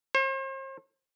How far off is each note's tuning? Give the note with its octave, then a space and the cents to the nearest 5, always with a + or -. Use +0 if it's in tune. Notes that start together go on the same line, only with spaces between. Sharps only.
C5 +40